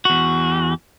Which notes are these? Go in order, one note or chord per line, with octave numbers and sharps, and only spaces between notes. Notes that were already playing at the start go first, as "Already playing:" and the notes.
E2 F#4